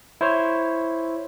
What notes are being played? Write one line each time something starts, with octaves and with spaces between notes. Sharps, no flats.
E4 C5 C#5